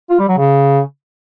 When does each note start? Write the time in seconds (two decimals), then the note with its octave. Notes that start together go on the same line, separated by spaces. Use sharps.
0.10 F4
0.19 G3
0.28 F#3
0.37 C#3